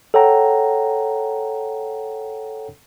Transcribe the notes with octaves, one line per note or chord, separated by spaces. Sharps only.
A4 C#5 F#5 G5 A#5